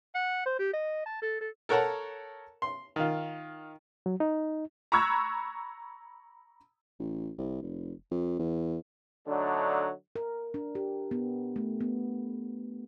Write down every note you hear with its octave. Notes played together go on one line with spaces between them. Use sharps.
F#5
C5
G4
D#5
A5
A4
A4
A4 A#4 C#5 F#5 A5 A#5
C6
D#3 F4
F#3
D#4
A#5 B5 C#6 E6 F#6 G#6
A1
C2
F1
F2
E2
D3 F#3 A3 D4 D#4
A#4
D4
G4
B3
A3
B3